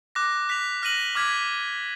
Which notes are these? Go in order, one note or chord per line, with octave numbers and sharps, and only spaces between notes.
D6 F#6 A#6
F#6 B6 F7
F6 A#6 D#7 F#7
D6 F6 G#6 B6